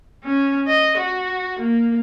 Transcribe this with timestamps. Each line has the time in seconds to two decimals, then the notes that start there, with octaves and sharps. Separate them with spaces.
0.24 C#4
0.68 D#5
0.98 F#4
1.59 A#3